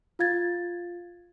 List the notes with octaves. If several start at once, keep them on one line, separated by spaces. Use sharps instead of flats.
F4 F5 G#6 A6